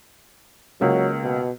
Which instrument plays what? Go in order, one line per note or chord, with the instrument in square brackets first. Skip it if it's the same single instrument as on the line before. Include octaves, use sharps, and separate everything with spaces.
[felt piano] C#2 A#3 [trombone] F#3
[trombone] B2